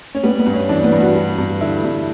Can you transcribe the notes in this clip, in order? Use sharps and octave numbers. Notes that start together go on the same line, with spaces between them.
C#4
G3 B3
B3
G2
C#4
E3 D4
B3
G2
F#4
G3
G2
D3 E4
G2